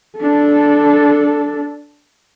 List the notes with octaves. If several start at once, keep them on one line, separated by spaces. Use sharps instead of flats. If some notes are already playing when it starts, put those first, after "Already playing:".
D4 A4